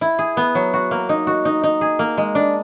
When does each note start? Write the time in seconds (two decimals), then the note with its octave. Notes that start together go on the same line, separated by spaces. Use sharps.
0.01 E4
0.19 G#4
0.37 B3
0.55 F#3
0.74 F#4
0.91 A#3
1.09 D#4
1.27 F#4
1.45 D#4
1.63 D#4
1.81 G#4
1.99 A#3
2.18 G#3
2.35 D4